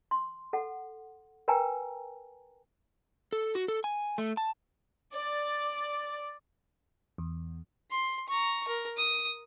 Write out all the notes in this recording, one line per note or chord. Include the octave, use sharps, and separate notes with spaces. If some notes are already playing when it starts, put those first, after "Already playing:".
C6
A4 F#5
A#4 B4 G5 G#5 A#5
A4
F#4
A4
G#5
A3
A5
D5
E2
C6
A#5 C#6
A#4
D#6